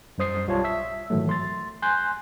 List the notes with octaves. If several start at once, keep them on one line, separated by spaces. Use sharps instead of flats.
F#2 G3 C5 D#6 C7
B1 G3 F4 C#5 A5
E5 E6 B6
G#2 D#3 E3 F#3 A3
C6 A6
G#5 C6 F#6 G6